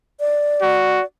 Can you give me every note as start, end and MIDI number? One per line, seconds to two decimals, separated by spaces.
0.20 1.05 74
0.62 1.02 66